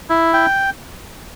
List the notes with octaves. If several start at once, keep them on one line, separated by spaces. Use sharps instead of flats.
E4
G5